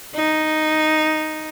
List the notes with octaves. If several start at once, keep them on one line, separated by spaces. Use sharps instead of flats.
D#4